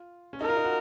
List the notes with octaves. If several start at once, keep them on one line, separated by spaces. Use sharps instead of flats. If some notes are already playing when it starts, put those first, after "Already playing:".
Already playing: F4
C#4
D#4 A#4
F4
D#4
F#4